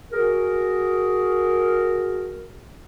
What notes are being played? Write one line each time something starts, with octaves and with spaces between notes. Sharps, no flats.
F#4 G#4 A#4